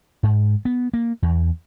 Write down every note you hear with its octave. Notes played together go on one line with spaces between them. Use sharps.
G#2
B3
A#3
E2